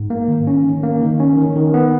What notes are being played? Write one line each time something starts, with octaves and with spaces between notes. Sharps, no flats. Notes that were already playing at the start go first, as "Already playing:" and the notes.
Already playing: G#2
A#3
D#3
C#4
D#3
A#3
D#3
C#4
D#3
D#3
B3